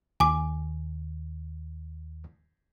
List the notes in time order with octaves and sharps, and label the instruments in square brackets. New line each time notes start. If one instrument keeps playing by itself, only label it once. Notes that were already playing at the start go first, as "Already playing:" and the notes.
[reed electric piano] D#2 [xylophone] G#5 D6